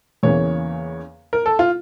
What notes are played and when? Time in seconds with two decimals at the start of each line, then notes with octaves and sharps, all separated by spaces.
0.23 E2 C#3 E3 A#3 C#5
1.33 A#4
1.46 A4
1.59 F4